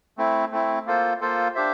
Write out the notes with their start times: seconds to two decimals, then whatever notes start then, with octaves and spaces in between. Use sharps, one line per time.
0.17 A3 C4 E4
0.52 A3 C4 E4
0.86 A#3 F4 A4 C5
1.21 A#3 F4 A4 C5
1.55 D4 G4 C5 E5